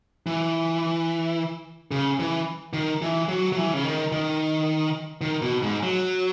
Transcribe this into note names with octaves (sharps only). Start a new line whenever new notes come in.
E3
C#3
E3
D#3
E3
F#3
F#3
E3
C#3
D#3
D#3
D#3
B2
G#2
F#3